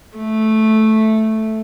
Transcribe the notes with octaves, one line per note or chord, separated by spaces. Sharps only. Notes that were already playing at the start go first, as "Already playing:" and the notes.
A3